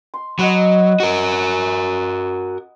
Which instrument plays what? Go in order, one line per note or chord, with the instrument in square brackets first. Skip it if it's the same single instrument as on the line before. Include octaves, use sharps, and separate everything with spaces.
[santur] C6
[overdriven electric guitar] F#3 [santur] D#5 F#5 B5
[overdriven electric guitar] F#4 A#4